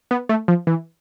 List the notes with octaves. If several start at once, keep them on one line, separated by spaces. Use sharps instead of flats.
B3
A3
F3
E3